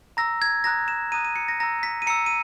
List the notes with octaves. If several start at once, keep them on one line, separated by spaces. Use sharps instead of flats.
A#5 E6 A#6
G#6
A#5 D#6 F#6 A#6
E7
A#5 D#6 F#6 D#7
D#7
C#7
A#6
A#5 E6 A#6
B6
D#7
A#5 E6 C#7
D#7